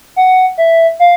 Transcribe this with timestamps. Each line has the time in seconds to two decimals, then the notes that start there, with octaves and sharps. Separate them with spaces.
0.16 F#5
0.58 E5
0.99 F5